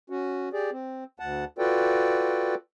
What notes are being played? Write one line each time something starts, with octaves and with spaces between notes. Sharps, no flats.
C#4 F#4
G4 G#4 D5
C4
D2 F#5 A5
F4 F#4 A4 B4 D5 G5